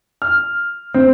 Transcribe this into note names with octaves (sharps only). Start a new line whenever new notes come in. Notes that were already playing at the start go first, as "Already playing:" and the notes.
F6
C4